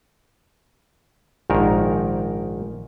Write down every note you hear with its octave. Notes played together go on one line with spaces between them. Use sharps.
A#1 G#2 D#3 A#4